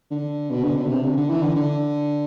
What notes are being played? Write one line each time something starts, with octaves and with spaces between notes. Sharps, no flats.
D3
B2
D3
B2
D3
C3
D3
D3
E3
D3
D3